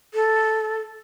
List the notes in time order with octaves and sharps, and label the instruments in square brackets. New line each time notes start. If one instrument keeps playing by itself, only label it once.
[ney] A4